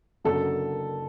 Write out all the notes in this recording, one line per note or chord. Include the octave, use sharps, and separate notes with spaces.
F#1 F#2 D3 F#3 A4